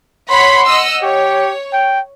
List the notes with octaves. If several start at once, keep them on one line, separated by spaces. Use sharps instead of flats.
C#5 F#5 B5 C6
D#5 F#5 E6
G4 C#5
G5